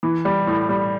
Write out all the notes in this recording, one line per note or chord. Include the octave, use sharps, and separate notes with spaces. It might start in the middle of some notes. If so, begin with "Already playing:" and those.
E3
G3
A2
G3